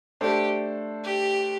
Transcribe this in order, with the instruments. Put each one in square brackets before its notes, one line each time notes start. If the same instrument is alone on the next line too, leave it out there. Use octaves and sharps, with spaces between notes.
[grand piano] A3 D4 A4 C5 [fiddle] G4
[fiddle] G4